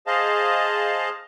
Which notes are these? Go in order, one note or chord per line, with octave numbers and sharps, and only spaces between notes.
G#4 C5 D#5 F5 A5